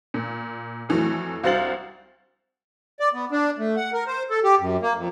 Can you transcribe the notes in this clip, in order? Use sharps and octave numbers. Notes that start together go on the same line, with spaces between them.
A#2
F2 E3 F#3 A3
C2 F#4 C5 F5 A6 F#7
D5
B3
D4
A3
F#5
A#4
C5
A4
G4
F#2
A#3
F2